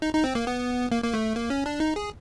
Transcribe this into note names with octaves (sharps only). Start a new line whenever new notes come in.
D#4
D#4
C4
A#3
B3
A#3
A#3
A3
A#3
C#4
D4
D#4
G#4